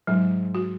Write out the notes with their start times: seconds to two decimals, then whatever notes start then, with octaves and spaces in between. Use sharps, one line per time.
0.07 G#2 F#3
0.55 F#4